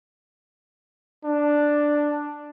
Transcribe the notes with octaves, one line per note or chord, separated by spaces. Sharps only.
D4